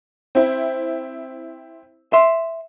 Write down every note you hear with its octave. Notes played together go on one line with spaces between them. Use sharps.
C4 E4
E5 C6